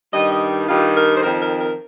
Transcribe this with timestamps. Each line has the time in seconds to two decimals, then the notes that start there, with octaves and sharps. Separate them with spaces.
0.13 G2 D#3 G3 D#5
0.31 D#5
0.67 G2 D#3 G3 F4
0.95 A#4
1.17 C5
1.22 F2 D#3 C4 A#4
1.41 A#4
1.59 A#4